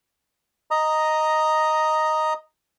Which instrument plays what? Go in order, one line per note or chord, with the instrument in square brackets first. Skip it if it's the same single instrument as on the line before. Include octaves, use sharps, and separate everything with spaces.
[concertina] D#5 A#5 D#6